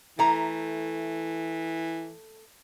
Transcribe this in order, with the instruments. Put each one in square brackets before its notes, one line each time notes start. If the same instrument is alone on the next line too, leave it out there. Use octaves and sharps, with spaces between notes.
[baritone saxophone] E3 [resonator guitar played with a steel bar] A3 A#5